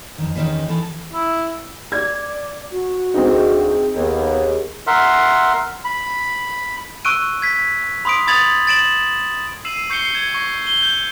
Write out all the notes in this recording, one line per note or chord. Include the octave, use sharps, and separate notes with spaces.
F2 D#3
E2 D#3 C4 C#4 D#4 B4
D#3 E3 A4
E4
D5 G#6
F#4
D2 C4 D#4 G#4
D#2 B3 G#4
A#4 E5 F#5 C6
B5
C#6 E6 F#6 D7 D#7
G#6 B6
B5 C6 D#6 B6 D7
B5 D#6 G#6 A6 F7 F#7
A6 D7 E7 F#7
E6 C7 D#7 E7 F#7
C#6 G6 C7 C#7 G7
G#6 E7
C#6
G7
G6